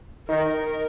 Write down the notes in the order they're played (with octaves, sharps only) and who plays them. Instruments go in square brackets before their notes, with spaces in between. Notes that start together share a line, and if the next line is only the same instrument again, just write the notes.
[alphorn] D#3 [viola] A#4